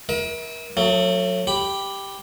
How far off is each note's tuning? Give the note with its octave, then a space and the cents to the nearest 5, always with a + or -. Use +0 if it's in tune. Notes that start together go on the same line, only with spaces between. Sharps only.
A#4 +35 E5 -30
F#3 -20 A3 +30
G4 +0 B5 +0